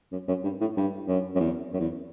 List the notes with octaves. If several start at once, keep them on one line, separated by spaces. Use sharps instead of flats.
F#2
F#2
G2
A2
G2
F#2
F#2
E2
F#2
E2